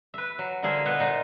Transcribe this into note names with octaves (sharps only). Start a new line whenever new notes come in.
B4 E5
F#3
D3 A#3 E4 G#4 C5 E5
B2 B3 B4 F#5
A#2 D#4 C5